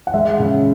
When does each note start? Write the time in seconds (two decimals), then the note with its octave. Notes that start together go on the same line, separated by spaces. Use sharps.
0.07 F#5
0.14 G#3 E5
0.40 C#3